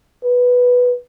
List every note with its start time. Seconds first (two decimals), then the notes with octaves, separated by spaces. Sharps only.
0.24 B4